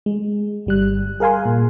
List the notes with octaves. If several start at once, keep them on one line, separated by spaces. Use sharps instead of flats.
G#3
G1 G3 F#6
G#4 A#4 F5 G#5 C6
A#2